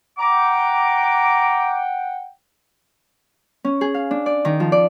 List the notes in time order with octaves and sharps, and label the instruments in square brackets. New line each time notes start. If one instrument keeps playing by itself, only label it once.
[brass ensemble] F#5 G5 [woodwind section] A#5 D6
[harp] C#4
G#4
F5
D4
D5
D#3
F3
D5